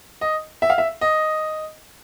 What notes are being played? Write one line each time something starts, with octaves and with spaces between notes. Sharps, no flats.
D#5
E5
F5
E5
D#5